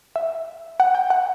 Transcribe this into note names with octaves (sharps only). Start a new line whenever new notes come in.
E5
F#5
G5
F#5